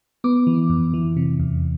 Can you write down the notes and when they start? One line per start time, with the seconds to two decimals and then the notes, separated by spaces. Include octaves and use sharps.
0.24 B3 D6
0.47 E3
0.70 F2
0.94 E3
1.17 C3
1.40 E2